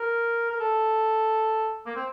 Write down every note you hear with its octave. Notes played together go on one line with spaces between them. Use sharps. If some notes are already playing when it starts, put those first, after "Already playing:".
Already playing: A#4
A#4
A4
A#3
C4